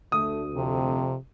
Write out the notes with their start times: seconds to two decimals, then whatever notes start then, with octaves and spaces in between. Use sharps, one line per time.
0.12 D2 A3 D#6
0.55 F2 C3